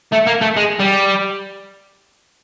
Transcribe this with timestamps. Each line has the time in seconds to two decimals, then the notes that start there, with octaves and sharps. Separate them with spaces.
0.13 A3
0.27 A#3
0.42 A3
0.57 G#3
0.80 G3